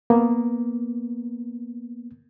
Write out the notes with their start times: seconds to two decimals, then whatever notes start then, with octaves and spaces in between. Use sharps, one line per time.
0.10 A#3 B3